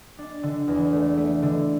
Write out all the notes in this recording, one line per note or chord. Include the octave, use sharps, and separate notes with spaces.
D4
D3
E2
A3
A3
D3